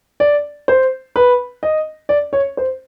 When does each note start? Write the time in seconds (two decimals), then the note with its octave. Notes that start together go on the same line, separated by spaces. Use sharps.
0.20 D5
0.68 C5
1.16 B4
1.63 D#5
2.09 D5
2.33 C#5
2.57 C5